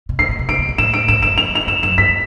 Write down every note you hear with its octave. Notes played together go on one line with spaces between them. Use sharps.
B2
A#2 C7
A#2
B2
C3 D7
A#2
A#2
A2 E7
D7
A2 E7
G2 E7
F2 F7
F7
G2 E7
F#2 E7
G2 B6